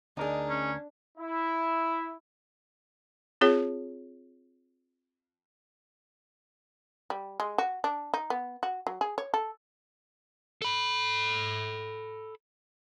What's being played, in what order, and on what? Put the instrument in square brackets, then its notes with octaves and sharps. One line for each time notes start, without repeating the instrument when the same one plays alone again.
[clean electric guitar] D2 A#4 [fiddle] D4 [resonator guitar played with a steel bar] D#4 G#4
[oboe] C#4
[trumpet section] E4
[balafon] C4 F4 G#4 C#5
[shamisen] G3
G#3
F#4
D4
D#4
B3
F#4
F#3
G#4
C#5
A4
[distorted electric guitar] A4 B5